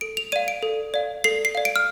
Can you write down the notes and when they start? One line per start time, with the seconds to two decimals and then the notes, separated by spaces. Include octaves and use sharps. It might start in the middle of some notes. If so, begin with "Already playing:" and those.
0.01 A4 D7
0.17 F7
0.32 D5 F5 D#7
0.48 D7
0.63 A4
0.94 D5 F5
1.24 A4 C7
1.45 C7
1.55 D5 F5
1.65 D7
1.76 F6